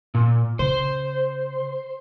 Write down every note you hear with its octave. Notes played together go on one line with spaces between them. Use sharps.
A#2
C#3 C5